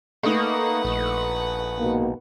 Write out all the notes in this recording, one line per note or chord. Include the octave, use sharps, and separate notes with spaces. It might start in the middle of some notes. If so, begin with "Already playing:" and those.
A3 A#3 D#4 B4 F#5
A#1
G#2 B2 A#3